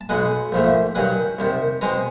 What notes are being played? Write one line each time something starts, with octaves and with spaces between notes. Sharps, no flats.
A5
B1 B2 G#3 F#5 G#5
A#1 G#2 F3 A3
G2 D#3 F#3 F#5 G#5
C2 C3 D#3
B2 G#3 C4 G#5 A#5